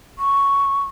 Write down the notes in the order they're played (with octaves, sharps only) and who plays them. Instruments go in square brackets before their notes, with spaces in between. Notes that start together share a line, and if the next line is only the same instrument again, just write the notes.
[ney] C#6